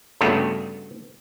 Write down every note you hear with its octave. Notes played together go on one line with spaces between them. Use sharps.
G2 C#3 A3 B3 D4 F#4